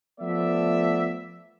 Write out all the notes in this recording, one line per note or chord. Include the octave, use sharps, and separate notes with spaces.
F3 A3 B3 D5 E5